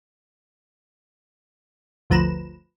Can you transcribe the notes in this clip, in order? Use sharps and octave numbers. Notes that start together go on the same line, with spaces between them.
G1 D2 F3 B4 A#5 E7